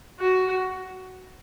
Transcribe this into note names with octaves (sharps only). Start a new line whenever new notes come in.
F#4